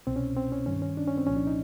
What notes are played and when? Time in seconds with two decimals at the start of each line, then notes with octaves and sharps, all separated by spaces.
0.07 C2 B2 C4
0.16 C#4
0.36 C4
0.52 C#4
0.66 G2 D#3 C#4
0.82 C#4
0.97 D4
1.07 C#4
1.17 C4
1.26 C2 A#2 F3 C#4
1.36 D4
1.47 D#4